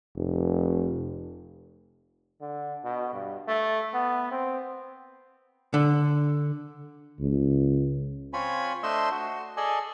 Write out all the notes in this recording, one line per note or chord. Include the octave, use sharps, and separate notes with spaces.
F1
D3
B2
G2
A3
B3
C4
D3
C#2
C4 F4 C#5 G#5 B5
A3 D4 C5 D#5 C6 E6
F#4
G#4 A4 D5 D#5 G#5